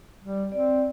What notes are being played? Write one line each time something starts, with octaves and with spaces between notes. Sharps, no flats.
G3
C4 D5